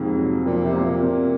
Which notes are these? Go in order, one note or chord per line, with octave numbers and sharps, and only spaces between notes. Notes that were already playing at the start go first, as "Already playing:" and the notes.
Already playing: F2 G#2 C3 A#3
F#3
F2 A#2
C3
A#3
A#2
C3